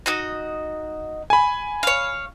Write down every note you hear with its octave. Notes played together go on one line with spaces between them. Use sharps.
D#4 F#4 D#5
G#5 B5
C#5 F5